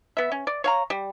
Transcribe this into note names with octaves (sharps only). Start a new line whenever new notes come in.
B3 E5
C#4
D5
C#5 F5 A#5
G3